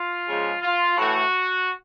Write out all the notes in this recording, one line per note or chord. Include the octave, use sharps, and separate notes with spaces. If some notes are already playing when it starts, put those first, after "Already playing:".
Already playing: F4
C#3 F3 G#3
F4
A2 E3 A3 F#4